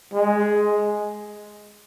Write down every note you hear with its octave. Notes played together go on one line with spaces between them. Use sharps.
G#3